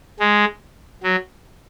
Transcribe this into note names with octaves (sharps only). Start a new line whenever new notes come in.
G#3
F#3